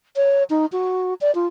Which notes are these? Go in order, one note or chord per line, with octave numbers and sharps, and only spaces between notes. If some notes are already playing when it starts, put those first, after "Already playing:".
C#5
D#4
F#4
D5
F4